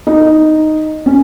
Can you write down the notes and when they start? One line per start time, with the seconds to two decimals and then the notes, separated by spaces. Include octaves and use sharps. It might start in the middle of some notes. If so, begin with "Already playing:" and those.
0.07 D#4
1.06 C#4